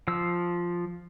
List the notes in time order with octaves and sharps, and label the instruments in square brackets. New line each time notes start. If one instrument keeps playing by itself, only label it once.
[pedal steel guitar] F3 E6